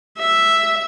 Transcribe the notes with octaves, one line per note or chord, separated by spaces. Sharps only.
E5